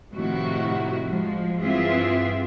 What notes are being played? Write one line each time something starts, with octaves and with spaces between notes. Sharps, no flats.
A2 C3 D#3 F3 E4 F#4
F3 G#3
G2 E3 C4 F4 G#4 E5